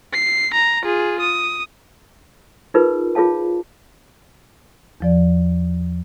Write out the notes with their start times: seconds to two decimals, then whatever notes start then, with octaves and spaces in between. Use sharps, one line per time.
0.14 C7
0.54 A#5
0.84 F4 G#4
1.21 D#6
2.74 D#4 F4 G#4 A#4 B4
3.15 F4 G#4 C#5 F5 A5
5.01 E2 F3 D5